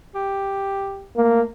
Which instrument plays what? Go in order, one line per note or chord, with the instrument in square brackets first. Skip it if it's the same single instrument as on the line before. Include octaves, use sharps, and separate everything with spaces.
[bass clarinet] G4
[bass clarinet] A3 [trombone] A#3